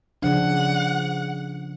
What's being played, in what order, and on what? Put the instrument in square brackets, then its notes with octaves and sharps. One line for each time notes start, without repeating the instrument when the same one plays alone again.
[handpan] C#3 F3 D4 [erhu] F#5